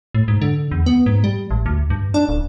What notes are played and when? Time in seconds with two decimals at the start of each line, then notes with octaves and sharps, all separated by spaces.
0.15 A2
0.28 G#2
0.42 D3
0.71 E2
0.86 B3
1.06 G#2
1.24 G3
1.51 A1
1.66 D2
1.90 G2
2.14 D4
2.29 D1